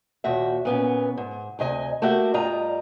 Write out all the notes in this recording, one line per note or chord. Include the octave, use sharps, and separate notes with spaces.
D#2 A#2 F#4 E5
A#2 B3 C#4
G#2
D2 C3 D#5 G#5
A3 A#3 F#4 G4 E5
G2 G3 F4 D#5 A#5